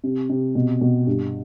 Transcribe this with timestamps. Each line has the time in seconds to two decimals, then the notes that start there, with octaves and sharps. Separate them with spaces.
0.04 C3
0.30 C3
0.55 B2
0.81 B2
1.07 G2